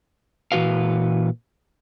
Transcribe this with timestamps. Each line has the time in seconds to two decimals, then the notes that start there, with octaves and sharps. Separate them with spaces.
0.52 A#2 E3 C#4 F#4 B4 F5